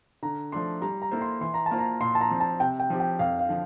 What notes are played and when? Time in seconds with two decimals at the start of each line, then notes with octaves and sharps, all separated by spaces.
0.23 D3 A#5
0.52 F3 A3 D4 C6
0.82 G3 A#5
1.02 A#5
1.11 A#3 E4 A4 C5
1.22 C6
1.41 E3 C6
1.54 A#5
1.66 A5
1.71 A#3 F4 C5
1.79 A#5
2.01 A#2 C6
2.15 A5
2.21 A#5
2.30 F3 C4
2.40 A5
2.60 C3 G5
2.80 G5
2.90 F3 C4 G4
3.00 G5
3.19 F2 F5
3.39 F5
3.49 D3 F3